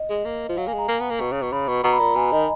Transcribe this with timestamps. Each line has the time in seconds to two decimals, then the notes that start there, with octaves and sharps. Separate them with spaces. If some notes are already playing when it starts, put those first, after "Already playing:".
Already playing: D#5
0.10 G#3
0.25 A#3
0.49 F3
0.57 F#3 F5
0.67 A#3 G#5
0.74 G#3 A#5
0.88 A#3
1.00 B3
1.10 A#3
1.21 B2
1.32 C#3
1.43 B2
1.52 C#3 B5
1.68 B2
1.84 B2 A#5
1.92 B5
2.00 A#2 A#5
2.16 B2 G#5
2.32 D#3 D#5